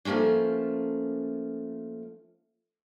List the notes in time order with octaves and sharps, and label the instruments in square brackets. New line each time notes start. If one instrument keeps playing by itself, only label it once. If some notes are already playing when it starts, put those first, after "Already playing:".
[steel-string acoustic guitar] F3 A3 A#3 C#4 D4